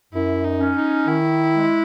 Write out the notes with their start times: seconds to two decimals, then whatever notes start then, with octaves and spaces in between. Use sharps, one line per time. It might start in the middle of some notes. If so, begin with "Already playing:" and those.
0.13 F#2 E4
0.44 D#4
0.60 C#4
0.76 D#4
1.07 D#3 E4
1.54 G#3